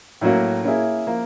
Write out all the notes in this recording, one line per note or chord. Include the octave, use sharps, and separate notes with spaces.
A2 F#3 A#3 C#4 F#4
A#3 C#4 E4 G#4
F3 A#3